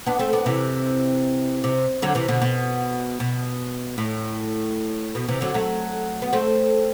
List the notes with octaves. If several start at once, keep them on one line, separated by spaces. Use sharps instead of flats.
B3 D4
A3 C4
B3 D4
C3 E3
C3
D3 F#3
C3 E3
B2 D3
B2
B2
A2
B2
C3 E3
D3 F#3
F#3 A3
B3
A3 C4